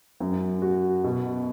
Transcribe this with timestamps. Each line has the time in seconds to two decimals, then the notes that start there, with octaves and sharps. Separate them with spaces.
0.20 F#2
0.62 F#4
1.04 B2